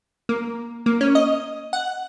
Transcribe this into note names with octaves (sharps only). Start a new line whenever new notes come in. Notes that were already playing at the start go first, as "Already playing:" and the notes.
A#3
A#3
C#4
D#5
F#5